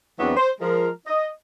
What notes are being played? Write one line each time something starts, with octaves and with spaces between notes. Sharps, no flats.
E2 E3 F#3 B3 C4 D4
C5
F3 G#3 A#4
D#5